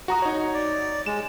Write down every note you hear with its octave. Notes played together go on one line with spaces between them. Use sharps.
F#4 A#5 D#6
D#4 C#5
D5
G#3 E7